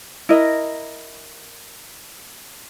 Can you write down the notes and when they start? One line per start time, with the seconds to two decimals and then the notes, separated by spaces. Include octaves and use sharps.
0.29 E4 A#4 D#5